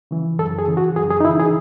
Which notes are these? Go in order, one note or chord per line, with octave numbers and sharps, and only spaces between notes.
C#3 E3
F#2 A4
G#4
C#3 E3
F#4
F#2 G#4
G#4
D#4
C#3 E3 E4
G#4